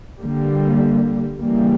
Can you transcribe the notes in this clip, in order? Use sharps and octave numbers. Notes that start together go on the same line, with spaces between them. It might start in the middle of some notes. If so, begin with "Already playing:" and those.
D3 G3 A#3
C#3 E3 G3 A#3